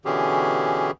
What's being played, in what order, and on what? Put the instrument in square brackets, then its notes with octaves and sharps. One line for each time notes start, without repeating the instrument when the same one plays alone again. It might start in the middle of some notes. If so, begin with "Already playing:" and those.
[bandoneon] B2 D3 E3 C#4 G4 G#4